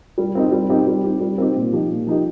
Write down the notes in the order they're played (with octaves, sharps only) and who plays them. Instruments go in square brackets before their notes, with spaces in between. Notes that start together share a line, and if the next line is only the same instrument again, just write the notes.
[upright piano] G3
C4 D#4 G4
G3
C4 D#4 G4
G3
C4 D#4 G4
G3
C4 D#4 G4
A#2
F3 D#4 G4
A#2
F3 D#4 G4